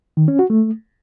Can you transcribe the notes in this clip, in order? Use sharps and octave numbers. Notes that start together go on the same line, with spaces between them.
D#3
C#4
F#4
A3